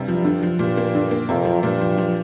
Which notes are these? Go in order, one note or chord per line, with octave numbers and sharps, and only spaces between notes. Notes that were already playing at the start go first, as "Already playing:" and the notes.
Already playing: G2 C3 G3
F3
D3
F3
G2 A#2
A#3
D3
A#3
F2 C3
F3
G2 A#2
F3
F3